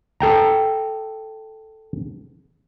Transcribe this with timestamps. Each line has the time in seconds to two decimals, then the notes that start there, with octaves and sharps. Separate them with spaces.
0.20 A4 G5 A#5